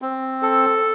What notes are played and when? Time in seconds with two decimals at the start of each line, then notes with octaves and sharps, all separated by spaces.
0.02 C4
0.43 A4